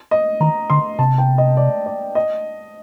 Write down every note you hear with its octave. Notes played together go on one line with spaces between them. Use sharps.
D#5
D#3 A#5
D3 C6
C3 A5
G5
D#5
D5
D5
D#5